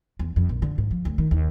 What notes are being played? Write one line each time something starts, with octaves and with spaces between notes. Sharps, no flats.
E2
F2
A#1
D3
G#2
F3
D2
D#3
D#2